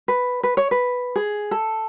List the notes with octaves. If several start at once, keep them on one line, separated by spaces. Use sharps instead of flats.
B4
B4
C#5
B4
G#4
A4